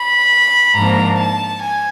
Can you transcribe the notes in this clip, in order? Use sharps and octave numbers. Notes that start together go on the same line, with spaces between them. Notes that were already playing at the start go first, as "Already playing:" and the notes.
Already playing: B5
G#2 F3 A#3 D4 A#5
A5
G#5